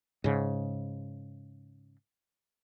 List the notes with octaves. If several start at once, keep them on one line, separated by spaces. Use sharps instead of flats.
G#2 C#3